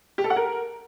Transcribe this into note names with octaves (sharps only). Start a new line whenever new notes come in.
G4
A4
F#5
A#4